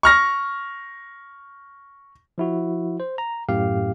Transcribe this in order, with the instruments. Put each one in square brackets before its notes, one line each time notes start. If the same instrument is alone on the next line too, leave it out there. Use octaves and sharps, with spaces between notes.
[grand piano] C#6 F6 A#6
[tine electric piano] F3 E4 F#4
C5
A#5
F#2 A2 G4 F5